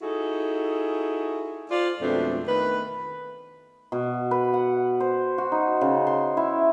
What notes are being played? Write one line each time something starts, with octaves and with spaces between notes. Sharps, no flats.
D#4 E4 F#4 G#4 A4
F4 C5 D5
F2 B2 G#3 A3 C4 D4
D#3 A3 B3 B4
B2
B4
F#5
C5
F#4
D#4
C#3
C6
E4